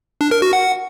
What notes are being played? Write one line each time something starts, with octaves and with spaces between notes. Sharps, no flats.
D4
A#4
F#4
F#5